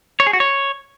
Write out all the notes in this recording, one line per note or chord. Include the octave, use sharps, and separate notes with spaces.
C#5
G#4
F#4
C#5